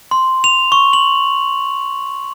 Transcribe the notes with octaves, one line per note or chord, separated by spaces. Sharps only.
C6
F7
C#6
F#7